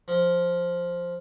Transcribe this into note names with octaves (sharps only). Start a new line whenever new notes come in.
F3